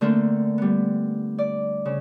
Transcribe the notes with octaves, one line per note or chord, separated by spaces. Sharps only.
D3 A3 A#3 C4 A4
G3 B3
D5
C#3